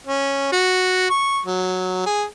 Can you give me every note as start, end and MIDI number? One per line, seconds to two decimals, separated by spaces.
0.07 0.48 61
0.52 1.08 66
1.10 1.40 85
1.46 2.05 54
2.06 2.23 68